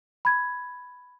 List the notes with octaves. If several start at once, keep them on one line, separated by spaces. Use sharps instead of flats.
B5 G#6